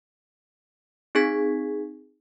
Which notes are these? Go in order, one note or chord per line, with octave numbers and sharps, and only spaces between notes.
C4 D#4 G#4 G#6 B6